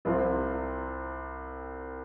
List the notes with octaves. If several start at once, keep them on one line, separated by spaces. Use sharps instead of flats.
C2 C3 F3 C4 F4